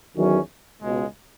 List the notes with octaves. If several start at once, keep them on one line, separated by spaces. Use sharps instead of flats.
E2 D#3 F#3 C#4
C#2 B2 G#3